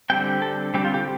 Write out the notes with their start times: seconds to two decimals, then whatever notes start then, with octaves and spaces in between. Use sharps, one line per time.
0.10 D3 G3 C4 G5
0.42 A4
0.74 D3 G3 C4 G4
0.85 F4
0.94 G4